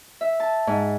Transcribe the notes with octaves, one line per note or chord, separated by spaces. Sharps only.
E5
A5
G#2